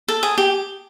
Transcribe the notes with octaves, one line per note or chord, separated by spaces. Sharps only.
A4
G#4
G4